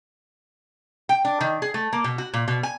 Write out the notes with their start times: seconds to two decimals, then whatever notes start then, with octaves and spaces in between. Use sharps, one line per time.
1.09 G5
1.25 D4
1.41 D#3
1.62 G#4
1.74 A3
1.93 A#3
2.04 B2
2.18 F#4
2.34 A#2
2.48 B2
2.63 G#5